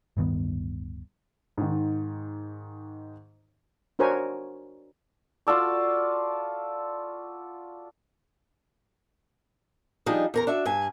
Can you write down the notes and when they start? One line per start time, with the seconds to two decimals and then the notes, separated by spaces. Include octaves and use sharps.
0.17 D1 G2 D#3 B3
1.57 G#2 D#3
3.99 D4 F#4 A#4 C5 C#5 G#5
5.47 F4 F#4 A4 D5
10.06 F3 G3 D4 D#4 G#4
10.34 E2 A#4 A#5
10.47 D4 F#4 E5
10.65 G2 G#5